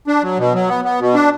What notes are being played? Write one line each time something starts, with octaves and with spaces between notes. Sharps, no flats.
D4
F#3
B2
F#3
B3
B3
B2
D4